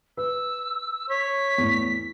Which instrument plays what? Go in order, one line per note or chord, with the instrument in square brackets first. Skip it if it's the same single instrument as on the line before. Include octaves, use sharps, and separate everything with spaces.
[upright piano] B4 [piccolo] E6
[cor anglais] C#5 [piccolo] B6
[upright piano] E2 A2